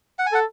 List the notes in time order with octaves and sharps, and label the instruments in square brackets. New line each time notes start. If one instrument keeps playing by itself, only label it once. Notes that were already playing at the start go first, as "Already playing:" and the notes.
[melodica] F#5
G#5
[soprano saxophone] A4 [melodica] F#5